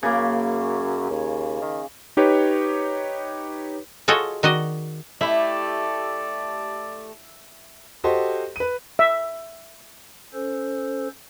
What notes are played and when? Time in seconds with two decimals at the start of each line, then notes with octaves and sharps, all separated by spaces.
0.03 F#2 C#3 A#3
1.10 D#2
1.61 D#3
2.17 D#4 G4 B4 C#5
4.08 F4 F#4 G#4 A4 C#5 D#5
4.43 D#3 F#4 D5 D#5
5.21 A3 E4 G4 D5 E5 G5
8.04 F#4 G4 A4 C5 D#5
8.56 B4 D#7
8.99 E5
10.33 C#4 A4 C5